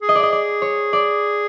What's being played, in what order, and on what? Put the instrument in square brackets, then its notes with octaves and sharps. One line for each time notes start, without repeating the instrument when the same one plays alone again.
[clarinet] G#4
[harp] D#5
D5
D#5
D5
C#5
D5